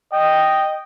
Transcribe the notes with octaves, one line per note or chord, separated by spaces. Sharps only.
D#5 G5